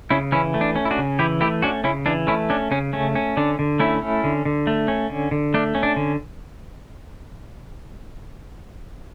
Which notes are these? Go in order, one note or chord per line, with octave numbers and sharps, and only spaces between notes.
C#3 C#4 E4
E3 C#4 E4
A3
D4
C#4
E4
D4 F#4
C#3
E3 E4 G4
A3 E4 G4
C#4 D4 F#4
C#3 C#4 E4
E3 D4
A3 C#4 E4
C#4 D4
C#3 C#4
A3 C#4
C#4
D3 D4
D3
A3 C#4 E4
C#4
D3
D3
A3
C#4
D3
D3
A3 D4
C#4
D4
D3